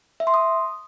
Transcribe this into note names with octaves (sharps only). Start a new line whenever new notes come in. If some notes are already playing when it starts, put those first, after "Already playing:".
E5
C6
D#6